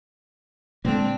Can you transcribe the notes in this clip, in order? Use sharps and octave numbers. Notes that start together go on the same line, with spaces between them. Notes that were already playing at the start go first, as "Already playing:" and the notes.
A#2 D3 G#3 A#3 C4 D4